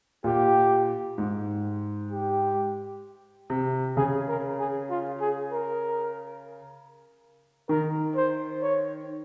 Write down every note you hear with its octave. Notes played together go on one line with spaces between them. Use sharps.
A#2 G4
G#2
G4
C3
C#3 G#4
A#4
G#4
F4
G#4
A#4
D#3 A#4
C5
C#5